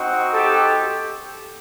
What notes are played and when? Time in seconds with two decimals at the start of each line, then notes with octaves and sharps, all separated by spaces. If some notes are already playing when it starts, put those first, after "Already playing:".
Already playing: C4 D#4 F#4
0.34 G4 A4